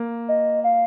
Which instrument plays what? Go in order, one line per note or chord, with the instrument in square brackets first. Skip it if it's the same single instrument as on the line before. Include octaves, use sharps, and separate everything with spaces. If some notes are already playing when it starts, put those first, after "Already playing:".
Already playing: [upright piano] A#3
[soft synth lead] D#5
F5